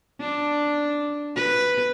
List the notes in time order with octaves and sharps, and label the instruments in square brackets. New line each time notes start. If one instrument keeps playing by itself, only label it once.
[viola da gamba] D4
B4